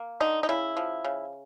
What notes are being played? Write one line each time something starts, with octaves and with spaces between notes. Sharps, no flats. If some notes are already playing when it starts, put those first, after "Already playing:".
Already playing: A#3
D3 D#4
D#4
C#3 E4
F3
C#3